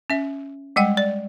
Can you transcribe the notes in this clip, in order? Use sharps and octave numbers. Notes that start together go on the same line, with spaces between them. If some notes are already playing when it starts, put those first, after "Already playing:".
C#4 E5
G3 G#3 F#5 G5
D5